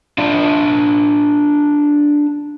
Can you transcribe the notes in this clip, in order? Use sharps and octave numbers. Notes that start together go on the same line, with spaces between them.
D4 F4